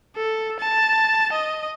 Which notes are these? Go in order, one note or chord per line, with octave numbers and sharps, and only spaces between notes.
A4
A5
D#5